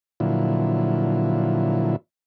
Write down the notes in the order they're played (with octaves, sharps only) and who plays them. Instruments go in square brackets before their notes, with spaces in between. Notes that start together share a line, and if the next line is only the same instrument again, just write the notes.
[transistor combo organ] A#2 D3 F3 F#3 E4